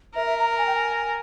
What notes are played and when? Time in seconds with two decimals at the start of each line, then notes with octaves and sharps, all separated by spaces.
0.15 A#4 E5
0.26 E5
0.38 A#5
0.50 A#5
0.58 G#5
0.67 G5
0.75 G#5